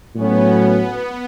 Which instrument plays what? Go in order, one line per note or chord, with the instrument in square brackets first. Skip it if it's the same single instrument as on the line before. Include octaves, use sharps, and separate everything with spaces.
[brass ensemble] A2 F#3 C#4 [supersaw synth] B3